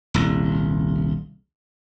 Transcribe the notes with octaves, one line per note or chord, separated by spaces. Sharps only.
D#1 C2